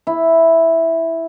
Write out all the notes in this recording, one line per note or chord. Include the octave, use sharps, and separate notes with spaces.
E4